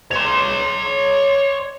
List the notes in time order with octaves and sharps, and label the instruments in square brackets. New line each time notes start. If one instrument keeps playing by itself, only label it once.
[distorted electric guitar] C#5 C6